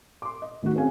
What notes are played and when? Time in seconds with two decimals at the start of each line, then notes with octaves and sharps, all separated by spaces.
0.22 C6 D6
0.42 D#5
0.62 D2 D#3 D#4 F#4
0.76 C4 C#4 G#4 F5 G#5